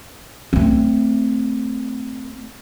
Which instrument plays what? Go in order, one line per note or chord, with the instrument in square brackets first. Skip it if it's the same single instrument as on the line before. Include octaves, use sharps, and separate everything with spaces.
[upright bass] A3 C4